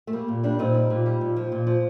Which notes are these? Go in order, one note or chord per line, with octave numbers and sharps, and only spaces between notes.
A3
G3 A#3
A#2
G3 A#3 D4
A#2 C4 D#4
G3
A#2
G3
A#2
F3
A#2
F3